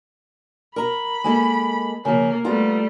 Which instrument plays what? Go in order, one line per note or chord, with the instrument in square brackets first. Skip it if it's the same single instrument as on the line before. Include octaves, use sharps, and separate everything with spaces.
[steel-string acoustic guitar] A#4 A#5 [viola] B5
[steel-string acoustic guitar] G#3 A#3 A4
[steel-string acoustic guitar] C#3 F3 [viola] A#3
[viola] G3 A3 [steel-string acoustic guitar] B3 F4 A#5